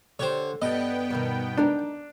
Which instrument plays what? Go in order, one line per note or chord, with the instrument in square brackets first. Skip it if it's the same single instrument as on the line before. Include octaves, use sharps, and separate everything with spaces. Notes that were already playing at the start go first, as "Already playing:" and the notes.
[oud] D3 G4 [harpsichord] C5 C#5
[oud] G2 G3 [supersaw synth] B3 G5 [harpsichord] D#5
[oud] G2 B2 D#3
[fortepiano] D4 [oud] D#4 A#4